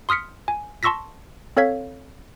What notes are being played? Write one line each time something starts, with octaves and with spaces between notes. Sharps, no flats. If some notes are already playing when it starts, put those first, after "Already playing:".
C6 D#6 F6 B6 C#7
G#5
A5 C6 C#6 E6 A#6 B6
C4 A4 C#5 F5 G#6 B6